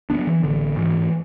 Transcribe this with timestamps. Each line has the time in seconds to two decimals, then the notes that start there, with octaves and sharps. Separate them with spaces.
0.10 D2 B3 D4
0.19 F#3
0.27 E3
0.43 A1 D3
0.77 G#2 E3